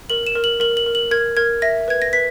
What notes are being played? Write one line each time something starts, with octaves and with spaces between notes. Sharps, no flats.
A#4 F#7
E7
A#4
F#7
A#4 F#7
F#7
A#4
F#7
A#4 G#6
A#4 G#6
E5 A#6
B4 G#6
A#6
B4 B6